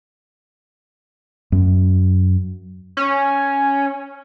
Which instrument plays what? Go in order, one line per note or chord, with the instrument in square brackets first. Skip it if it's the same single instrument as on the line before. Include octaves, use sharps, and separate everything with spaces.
[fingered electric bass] F#2
[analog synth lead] C#4